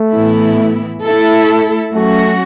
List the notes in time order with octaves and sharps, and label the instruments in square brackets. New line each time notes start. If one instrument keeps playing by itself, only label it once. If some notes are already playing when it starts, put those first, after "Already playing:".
Already playing: [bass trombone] A3
[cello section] A2 E3 B3 E4
A3 E4 A4
[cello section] F#3 C#4 F#4 [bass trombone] A3